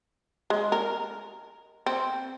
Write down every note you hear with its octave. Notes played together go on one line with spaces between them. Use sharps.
G#3
A#4
C4